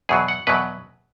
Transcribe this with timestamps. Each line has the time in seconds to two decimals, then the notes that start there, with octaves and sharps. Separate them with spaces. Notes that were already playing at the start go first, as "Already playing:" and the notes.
0.09 E2 B2 F#3 G#4
0.28 F#5
0.47 E2 B2 F#3 B4